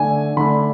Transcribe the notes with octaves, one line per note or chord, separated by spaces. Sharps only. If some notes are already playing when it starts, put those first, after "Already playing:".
Already playing: D3 A3 D4 G#5
D3 A3 D4 B5